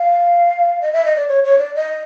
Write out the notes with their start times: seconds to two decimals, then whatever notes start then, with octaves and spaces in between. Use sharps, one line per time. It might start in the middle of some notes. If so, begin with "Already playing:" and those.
Already playing: F5
0.81 D#5
0.93 E5
1.05 D#5
1.16 D5
1.28 C#5
1.44 C#5
1.58 D5
1.75 D#5